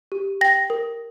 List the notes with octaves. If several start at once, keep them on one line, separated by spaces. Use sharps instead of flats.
G4
G5 A#6
A#4